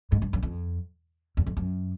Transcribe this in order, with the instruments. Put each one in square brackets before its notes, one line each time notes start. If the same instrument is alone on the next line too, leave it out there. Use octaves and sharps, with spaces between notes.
[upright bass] G#2
G2
F#2
F2
E2
F2
F#2